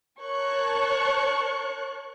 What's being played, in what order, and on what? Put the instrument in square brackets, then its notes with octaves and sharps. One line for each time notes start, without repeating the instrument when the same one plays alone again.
[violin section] A#4 C#5 A5 C#6 F#6